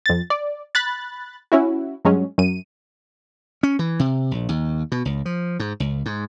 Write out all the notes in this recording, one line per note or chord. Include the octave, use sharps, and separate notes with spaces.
F2 A6
D5
B5 F#6 A6
C#4 E4 F#4
G2 F#3 G#3 C#4
F#2 D#7
C#4
E3
C3
A#1
D#2
B2
C#2
F3
G#2
C#2
G#2